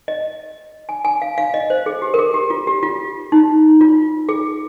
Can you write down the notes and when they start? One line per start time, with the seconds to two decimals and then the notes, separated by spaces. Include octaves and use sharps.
0.08 D#5
0.89 G#5
1.05 G#5
1.22 F5
1.38 F5
1.54 D#5
1.70 C5
1.86 G#4
2.02 G4
2.14 A#4
2.19 G#4
2.34 G4
2.50 F4
2.67 G4
2.83 F4
3.32 D#4
3.81 F4
4.29 G#4